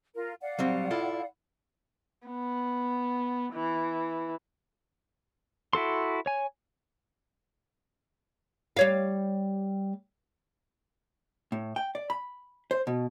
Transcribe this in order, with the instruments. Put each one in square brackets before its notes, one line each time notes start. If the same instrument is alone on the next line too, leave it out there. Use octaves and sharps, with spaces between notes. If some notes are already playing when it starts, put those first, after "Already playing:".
[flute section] F4 A#4
D5 F5 F#5
[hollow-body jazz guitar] F#3 G3 C4
E4 F4 A4
[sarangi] B3
E3
[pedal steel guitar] E4 F#4 A4 C6
C#5 G#5
[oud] G3 C#5 F5
[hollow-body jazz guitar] A2
G5
D5
B5
C5
B2